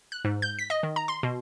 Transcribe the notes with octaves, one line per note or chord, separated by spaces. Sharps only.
F#6
G#2
G6
B6
D#5
D#3
A#5
C6
B2